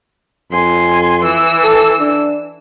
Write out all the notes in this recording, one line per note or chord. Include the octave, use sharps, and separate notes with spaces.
F2 G#5 C6
E3 E6
A4
D4